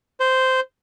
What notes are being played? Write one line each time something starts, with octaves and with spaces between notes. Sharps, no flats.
C5